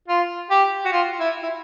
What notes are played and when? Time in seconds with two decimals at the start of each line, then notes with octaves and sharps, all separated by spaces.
0.08 F4
0.51 G4
0.85 F#4
0.93 F4
1.20 E4
1.44 E4